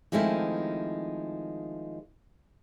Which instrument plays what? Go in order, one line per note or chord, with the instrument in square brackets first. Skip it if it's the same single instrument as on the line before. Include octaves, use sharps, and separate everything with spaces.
[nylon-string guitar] D#3 F3 G#3 A3 C4 E4